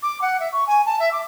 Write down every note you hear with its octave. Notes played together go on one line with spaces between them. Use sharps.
D6
F#5
E5
C#6
G#5
A5
E5
D6